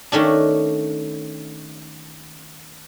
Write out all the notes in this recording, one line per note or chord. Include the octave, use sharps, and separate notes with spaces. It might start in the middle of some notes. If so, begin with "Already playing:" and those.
D#3 A3 C#4 D4